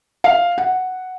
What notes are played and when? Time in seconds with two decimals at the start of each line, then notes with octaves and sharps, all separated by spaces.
0.24 F5
0.58 F#5